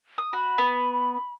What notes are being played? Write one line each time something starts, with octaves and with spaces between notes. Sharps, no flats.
D#6
F#4 B5
B3